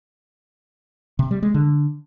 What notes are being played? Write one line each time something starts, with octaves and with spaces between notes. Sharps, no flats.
C3
G3
G#3
D3